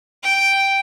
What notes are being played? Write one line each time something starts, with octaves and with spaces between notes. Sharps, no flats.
G5